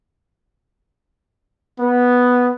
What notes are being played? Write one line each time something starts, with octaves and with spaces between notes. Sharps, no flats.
B3